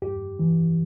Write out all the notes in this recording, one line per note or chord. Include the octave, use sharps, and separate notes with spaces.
G2 G4
E3